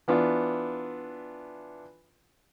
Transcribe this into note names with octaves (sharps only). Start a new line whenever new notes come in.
E3 B3 D4 F4